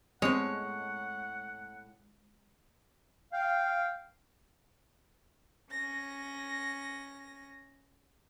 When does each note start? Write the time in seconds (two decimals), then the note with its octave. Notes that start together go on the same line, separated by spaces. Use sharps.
0.22 A2 G3 G#3 B3 C4 C#5 F#5
3.33 F5 G5
5.71 C#4 A#6